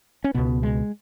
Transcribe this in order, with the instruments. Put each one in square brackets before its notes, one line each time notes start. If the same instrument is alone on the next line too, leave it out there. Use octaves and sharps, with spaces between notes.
[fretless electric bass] C#4
C#2 B2 B3
G#3